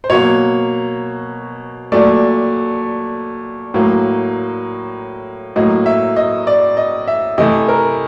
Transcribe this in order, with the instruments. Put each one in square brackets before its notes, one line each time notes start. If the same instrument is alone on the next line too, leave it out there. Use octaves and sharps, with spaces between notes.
[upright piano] C5
B2 F#3 A#3 C#5
A#2 F#3 A3 D5
A2 F#3 A#3
A2 F#3 A#3 D#5
E5
D#5
D5
D#5
E5
C3 E3 A3 D#5
A#4